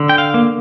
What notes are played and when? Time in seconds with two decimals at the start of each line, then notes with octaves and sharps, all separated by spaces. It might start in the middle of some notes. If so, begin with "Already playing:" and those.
Already playing: D3
0.09 G5
0.18 F5
0.34 A#3